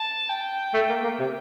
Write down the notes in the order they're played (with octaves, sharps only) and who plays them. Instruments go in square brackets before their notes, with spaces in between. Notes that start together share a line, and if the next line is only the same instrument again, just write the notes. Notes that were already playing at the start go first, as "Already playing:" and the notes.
Already playing: [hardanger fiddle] A5
G5
[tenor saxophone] A3
A#3
A#3
C3